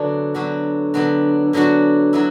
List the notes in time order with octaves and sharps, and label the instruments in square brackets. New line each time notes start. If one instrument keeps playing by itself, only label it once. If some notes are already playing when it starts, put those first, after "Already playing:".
Already playing: [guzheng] D3 F#3 B3 D4 F#4
D3 F#3 B3 D4 F#4
D3 F#3 B3 D4 F#4
D3 F#3 B3 D4 F#4
F#3 B3 E4